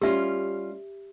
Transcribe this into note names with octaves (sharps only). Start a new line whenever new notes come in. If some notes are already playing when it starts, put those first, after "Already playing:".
G3 C#4 F4 G4 E5